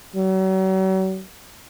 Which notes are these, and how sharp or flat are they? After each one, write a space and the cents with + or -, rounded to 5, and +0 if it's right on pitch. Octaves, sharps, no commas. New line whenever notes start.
F#3 +40